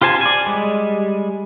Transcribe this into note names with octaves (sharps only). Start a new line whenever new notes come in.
F4 G4 C5 G#5 A5
D5 G#5
G3 G#3